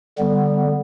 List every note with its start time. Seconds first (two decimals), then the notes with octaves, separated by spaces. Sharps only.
0.18 D3 G3 B3